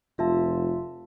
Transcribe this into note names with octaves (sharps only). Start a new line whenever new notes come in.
F1 F4 E5 A5